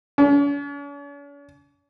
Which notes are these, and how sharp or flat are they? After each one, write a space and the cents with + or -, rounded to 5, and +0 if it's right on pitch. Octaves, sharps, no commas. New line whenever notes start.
C#4 +45